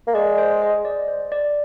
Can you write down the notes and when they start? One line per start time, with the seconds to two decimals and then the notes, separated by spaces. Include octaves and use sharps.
0.08 A#3
0.14 G#3 D5
0.38 C5
0.62 D#5
0.85 D5
1.08 C5
1.32 D5